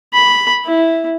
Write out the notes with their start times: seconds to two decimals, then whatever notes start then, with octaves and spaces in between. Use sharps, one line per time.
0.14 B5
0.65 E4